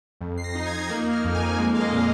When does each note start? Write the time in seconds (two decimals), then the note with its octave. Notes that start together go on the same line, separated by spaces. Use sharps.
0.21 F2
0.37 C7
0.44 A#6
0.55 D#4 A#6
0.66 G#6
0.86 A#6
0.89 A#3 G#6
1.12 F6
1.24 F2
1.35 G#5
1.58 G#3 G#5
1.75 F5
1.81 D#5
1.92 A#2